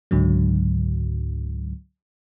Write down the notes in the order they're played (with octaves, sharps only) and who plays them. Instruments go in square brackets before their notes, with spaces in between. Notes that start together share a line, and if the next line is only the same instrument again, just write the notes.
[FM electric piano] C#2 G#2 D3 F#3